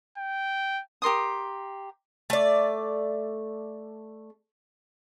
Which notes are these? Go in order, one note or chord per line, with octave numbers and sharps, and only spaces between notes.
G5
G4 A#4 C6 D#6
A3 D5